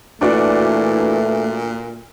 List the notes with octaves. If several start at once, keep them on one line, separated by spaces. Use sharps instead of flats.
A#2 E3 A3 D4 F#4 D5